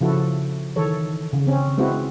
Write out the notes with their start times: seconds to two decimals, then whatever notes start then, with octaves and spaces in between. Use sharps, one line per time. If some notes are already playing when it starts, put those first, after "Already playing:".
0.01 C#3 F3 E4 F#4 A4
0.76 D#3 E3 A4 C#5
1.33 C#3
1.47 C4 C#4
1.78 G#3 B3 C4 E4 F#4